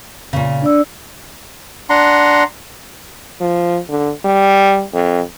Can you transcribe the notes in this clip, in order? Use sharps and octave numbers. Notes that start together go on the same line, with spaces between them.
A#2 C#3
D4 D5 E6
D4 F#5 A#5 C6
F3
D3
G3
F2